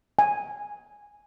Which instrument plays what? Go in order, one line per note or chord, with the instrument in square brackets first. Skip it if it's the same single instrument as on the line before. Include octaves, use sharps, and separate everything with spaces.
[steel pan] G#5